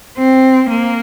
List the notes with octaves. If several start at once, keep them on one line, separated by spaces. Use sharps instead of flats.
C4
A#3